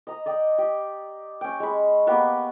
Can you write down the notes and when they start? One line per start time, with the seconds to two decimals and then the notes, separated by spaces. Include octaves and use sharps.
0.07 D#5 A#5
0.26 D5 D#5 G5
0.58 G4
1.41 C#4 G5
1.60 G#3 B5
2.07 A#3 B3 G4